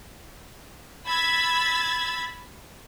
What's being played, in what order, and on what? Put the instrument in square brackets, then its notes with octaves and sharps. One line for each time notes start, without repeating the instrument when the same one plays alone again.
[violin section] B5 E6 G#6 A6 B6